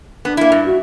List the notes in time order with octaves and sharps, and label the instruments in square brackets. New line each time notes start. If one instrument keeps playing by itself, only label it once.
[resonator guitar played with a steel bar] B3 [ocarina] D4
[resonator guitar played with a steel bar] A#3 E4
G2
[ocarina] F#4